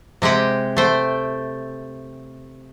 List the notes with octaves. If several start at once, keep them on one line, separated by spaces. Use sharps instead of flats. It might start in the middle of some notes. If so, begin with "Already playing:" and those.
C3 G#3 G4 F#5 G5
A3 C5 G5